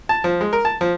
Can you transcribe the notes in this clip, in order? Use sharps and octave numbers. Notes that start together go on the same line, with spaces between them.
A5
F3
G#3
A#4
A5
F3